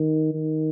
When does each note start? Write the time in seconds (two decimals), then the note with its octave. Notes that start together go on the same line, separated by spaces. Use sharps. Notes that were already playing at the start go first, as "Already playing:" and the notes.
Already playing: D#3
0.33 D#3